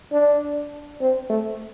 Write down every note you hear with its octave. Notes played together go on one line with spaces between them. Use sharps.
D4
C4
A3